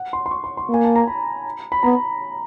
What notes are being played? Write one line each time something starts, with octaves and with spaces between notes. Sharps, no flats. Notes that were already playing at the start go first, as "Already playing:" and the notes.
Already playing: F#5
C6
C6
C#6
C6
C6
A#3 G#5
A5
A#5
B5
B5
B3 A#5